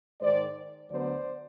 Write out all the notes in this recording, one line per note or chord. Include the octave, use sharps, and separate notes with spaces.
G#2 D#3 G#3 C5 D5
D2 D3 F#3 B3 C5 D5